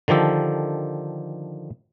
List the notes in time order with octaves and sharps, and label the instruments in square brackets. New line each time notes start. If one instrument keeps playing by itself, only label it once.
[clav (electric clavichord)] D3 D#3 F3 G4 A4